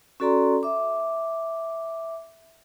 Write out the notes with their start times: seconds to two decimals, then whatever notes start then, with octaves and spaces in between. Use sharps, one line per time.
0.20 C#4 F#4 A4 D5 A#5 C6
0.63 E5 D6